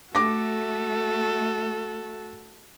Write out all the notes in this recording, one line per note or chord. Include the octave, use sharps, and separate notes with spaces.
A3 F#4 A4 D6 A#6